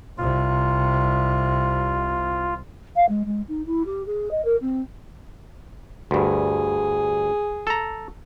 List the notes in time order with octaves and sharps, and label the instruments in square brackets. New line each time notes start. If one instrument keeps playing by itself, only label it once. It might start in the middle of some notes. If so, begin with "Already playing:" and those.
[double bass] C2 C3 [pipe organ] F4
[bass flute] F5
G#3
G#3
D#4
E4
G4
G#4
D#5
A#4
C4
[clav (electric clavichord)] D2 G2 [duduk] G#4
[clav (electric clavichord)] A4 A#5